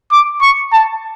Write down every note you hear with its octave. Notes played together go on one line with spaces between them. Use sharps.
D6
C#6
A5